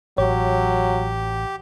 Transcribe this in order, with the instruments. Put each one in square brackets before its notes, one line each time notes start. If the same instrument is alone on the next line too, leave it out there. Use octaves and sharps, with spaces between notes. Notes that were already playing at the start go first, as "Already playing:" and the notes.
[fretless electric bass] A1 [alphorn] F#3 [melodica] G4 [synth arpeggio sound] C#5